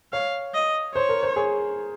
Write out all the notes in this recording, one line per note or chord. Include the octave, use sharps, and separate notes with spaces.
C#5 F5
D#5
C5 C#5
A#4
C5
G#4